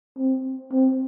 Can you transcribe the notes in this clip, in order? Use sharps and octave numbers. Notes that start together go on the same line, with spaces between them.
C4
C4